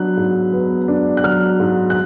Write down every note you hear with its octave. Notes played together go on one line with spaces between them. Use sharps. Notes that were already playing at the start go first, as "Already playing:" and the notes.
Already playing: F#3 B3 D4 F#6
G#2
B3
D4
F#6
F#3 F6
G#2
F#6